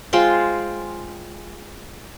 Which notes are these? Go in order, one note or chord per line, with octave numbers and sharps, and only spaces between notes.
G#3 F4 C5 G5